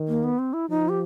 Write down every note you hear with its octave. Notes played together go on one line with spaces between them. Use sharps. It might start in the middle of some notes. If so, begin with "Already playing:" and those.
Already playing: D#3
A#3
B3
C4
E4
F3 D#4
G4